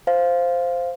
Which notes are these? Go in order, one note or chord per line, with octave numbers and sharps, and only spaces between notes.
C5 F5